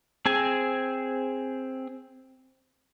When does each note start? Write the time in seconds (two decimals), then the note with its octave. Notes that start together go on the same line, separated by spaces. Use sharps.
0.26 C4 G#4 G#5